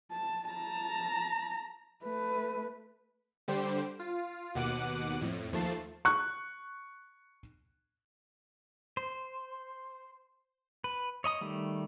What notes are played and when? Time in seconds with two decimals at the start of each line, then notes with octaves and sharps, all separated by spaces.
0.12 A5
0.50 A5 A#5
2.04 A3 B4
3.48 D3 G3 G4 C5
4.00 F4
4.55 D#2 B2 F#5 D6 F#6 D#7
5.21 F2 A2
5.52 D#2 F3 A3 A5 C7
6.05 C#6 F#6
8.97 C5
10.84 B4
11.24 C#5 D#5 A#5 D#6
11.41 D#3 G3 A3